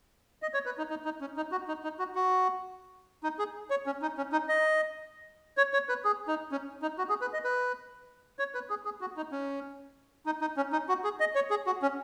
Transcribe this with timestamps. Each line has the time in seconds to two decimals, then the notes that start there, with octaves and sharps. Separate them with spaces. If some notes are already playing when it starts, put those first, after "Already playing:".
0.42 D#5
0.54 C#5
0.65 B4
0.78 D#4
0.90 D#4
1.05 D#4
1.21 C#4
1.37 D#4
1.52 F#4
1.68 D#4
1.84 D#4
1.99 F#4
2.15 F#4
3.23 D#4
3.39 G#4
3.70 C#5
3.86 C#4
4.02 D#4
4.17 C#4
4.32 D#4
4.49 D#5
5.57 C#5
5.73 C#5
5.89 B4
6.05 G#4
6.28 D#4
6.52 C#4
6.82 D#4
6.98 F#4
7.09 G#4
7.21 B4
7.33 D#5
7.44 B4
8.39 C#5
8.54 B4
8.70 G#4
8.85 G#4
9.01 F#4
9.17 D#4
9.32 C#4
10.26 D#4
10.41 D#4
10.57 C#4
10.72 D#4
10.89 F#4
11.04 G#4
11.20 D#5
11.35 C#5
11.50 G#4
11.66 F#4
11.82 C#4